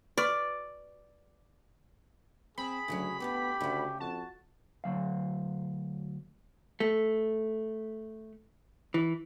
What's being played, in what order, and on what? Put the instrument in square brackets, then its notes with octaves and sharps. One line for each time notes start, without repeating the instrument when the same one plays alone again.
[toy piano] F#4 B4 C#6 [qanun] D5
[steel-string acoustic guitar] C4 [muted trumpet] G#4 [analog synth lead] B5
[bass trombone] D2 [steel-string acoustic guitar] C#3 E3 F#3
[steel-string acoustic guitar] D2 A2 D3 [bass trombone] B3 [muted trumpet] G4
[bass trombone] D2 [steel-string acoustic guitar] C#3 A3
[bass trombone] F2 [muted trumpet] F#4 [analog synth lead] A5
[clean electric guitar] D2 E3 F#3 F5
[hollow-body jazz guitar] A3
E3